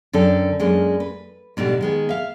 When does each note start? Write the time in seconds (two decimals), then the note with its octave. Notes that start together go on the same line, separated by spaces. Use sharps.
0.13 F#2 D3 D4 A4 G5
0.60 F#2 G#3 A#3 D4
1.00 B4
1.57 G#2 B2 D3 G3
1.81 D#3 G#3 B3
2.09 E5 F5